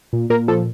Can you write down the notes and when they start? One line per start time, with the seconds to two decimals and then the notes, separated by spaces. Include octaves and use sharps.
0.13 A#2
0.30 A#2 A#4
0.48 F3 A4